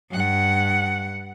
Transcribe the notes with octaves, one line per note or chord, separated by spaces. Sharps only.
G2 F#5